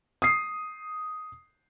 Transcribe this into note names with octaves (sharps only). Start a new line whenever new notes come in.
D#6 C7